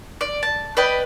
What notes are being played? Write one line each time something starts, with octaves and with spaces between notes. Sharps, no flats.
D5
A5
B4 D5 D#5 G5